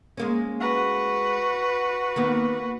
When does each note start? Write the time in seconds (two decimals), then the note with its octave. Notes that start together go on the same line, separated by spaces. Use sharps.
0.17 G#3 A#3 C#4
0.60 F#4 B4
2.16 D#3 A#3 B3